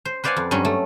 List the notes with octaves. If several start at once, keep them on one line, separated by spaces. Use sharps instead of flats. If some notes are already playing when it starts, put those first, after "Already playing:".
C5
B4 C5 D5 F5 F#5 G#5
F2
G2 F#3 G3 C#4
A3